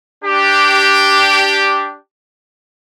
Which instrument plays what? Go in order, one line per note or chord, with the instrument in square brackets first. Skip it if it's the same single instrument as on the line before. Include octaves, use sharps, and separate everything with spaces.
[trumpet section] D4 G4